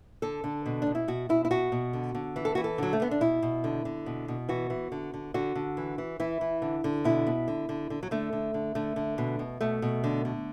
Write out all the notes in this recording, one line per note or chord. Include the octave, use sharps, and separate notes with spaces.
D3 A4
D3
B2
B2 D4
E4
B2 F#4
B2 E4
E4
B2 F#4
B2
D3
D3
E3
A4
E3 F#4
A4
D3 F#3
A3
D3 B3
D4
B2 E4
B2
D3
D3
B2
B2
E3 F#4
E3
D3
D3
D3 F#4
D3
E3
E3
E3 E4
E3
D3
D3
B2 E4
B2
D3
D3
D3
F#3
D3 A3
D3
D3
D3 A3
D3
B2
B2
B2 A3
B2
D3
D3